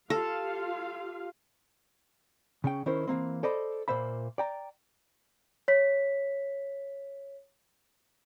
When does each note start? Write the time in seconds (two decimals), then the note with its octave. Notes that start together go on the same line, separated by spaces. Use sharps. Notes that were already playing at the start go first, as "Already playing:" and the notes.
0.10 F4 G4 A4 F5
2.64 C#3 C#4 G5
2.86 D#3 C#4 E4 A#4 C5
3.07 E3 F#3 A#3 C4
3.43 A4 C5 D5 D#5 B5
3.88 A#2 A#3 C5 E5 B5
4.38 D5 G5 A#5
5.68 C#5 B6